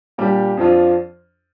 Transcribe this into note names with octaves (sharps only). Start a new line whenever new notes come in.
A#2 G3 D4 G4
F2 F3 D4 F4